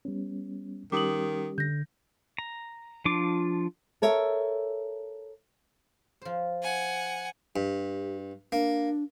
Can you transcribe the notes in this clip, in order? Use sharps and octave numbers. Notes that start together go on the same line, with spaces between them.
G3 B3 C#4
D#3 G3 C#4 G4 D6 D#6 F#7
D3 G6 A#6
A#5
F3 D4 F4 D6
A4 A#4 C#5 E5
F3 C5
F#5 G#5
G2 G4
A#3 D4